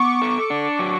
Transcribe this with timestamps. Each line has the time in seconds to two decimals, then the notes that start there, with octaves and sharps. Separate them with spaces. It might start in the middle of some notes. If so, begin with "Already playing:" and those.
Already playing: B3 C#6 D6
0.21 A4
0.50 D4
0.79 F#3